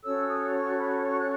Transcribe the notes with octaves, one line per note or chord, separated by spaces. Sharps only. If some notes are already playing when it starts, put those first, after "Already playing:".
C#4 F#4 A4 C#5 E6
D#6
C#6
B5
C#6
F#6